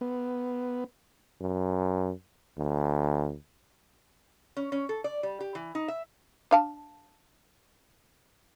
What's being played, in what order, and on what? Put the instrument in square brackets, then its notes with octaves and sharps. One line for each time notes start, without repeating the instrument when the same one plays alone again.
[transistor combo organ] B3
[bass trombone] F#2
D2
[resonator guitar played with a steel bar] C#4
C#4
A4
D5
G3
G4
E3
D#4
E5
[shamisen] D4 F5 A5